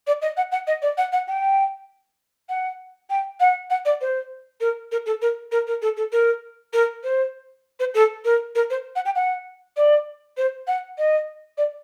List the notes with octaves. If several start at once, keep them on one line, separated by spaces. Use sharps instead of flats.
D5
D#5
F#5
F#5
D#5
D5
F#5
F#5
G5
F#5
G5
F#5
F#5
D5
C5
A#4
A#4
A4
A#4
A#4
A#4
A4
A4
A#4
A#4
C5
C5
A4
A#4
A#4
C5
F#5
G5
F#5
D5
C5
F#5
D#5
D5